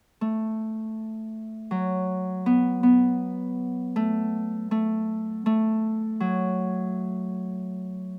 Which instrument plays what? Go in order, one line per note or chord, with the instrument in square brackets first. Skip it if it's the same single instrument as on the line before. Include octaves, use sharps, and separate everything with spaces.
[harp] A3
F#3
B3
B3
A3
A3
A3
F#3